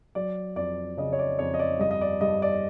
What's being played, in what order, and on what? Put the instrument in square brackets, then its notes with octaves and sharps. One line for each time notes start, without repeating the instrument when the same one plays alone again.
[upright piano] F#3 D5
F2 D5
C#3 D#5
C#5
D5
F2 C#5
D#5
D5
G2 D#5
D#5
D5
G2 D#5
D5